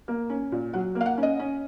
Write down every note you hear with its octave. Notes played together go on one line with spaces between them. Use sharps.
A#3
C#4
A#2
F#3 F#5
A#3
F5
F#5
C#4
D#5
C#4